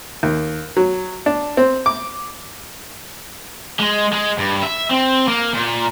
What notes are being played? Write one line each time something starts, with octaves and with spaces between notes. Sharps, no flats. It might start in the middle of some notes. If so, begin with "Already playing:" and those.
D#2
F#3
D4
C4
D6
G#3
G#3
G2
E5
C4
A#3
A#2